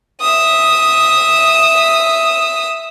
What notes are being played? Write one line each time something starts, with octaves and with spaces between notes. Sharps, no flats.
E5 D#6